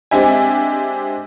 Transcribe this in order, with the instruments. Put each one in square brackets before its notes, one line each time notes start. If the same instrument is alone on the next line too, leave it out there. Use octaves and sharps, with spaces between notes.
[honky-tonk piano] G#3 C4 D4 G4 E5 G#5